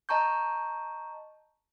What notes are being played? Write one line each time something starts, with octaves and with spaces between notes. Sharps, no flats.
D#5 A5 A#5 C#6 G6